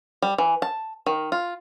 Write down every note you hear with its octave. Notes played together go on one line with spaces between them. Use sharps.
G3
E3
A5
D#3
F4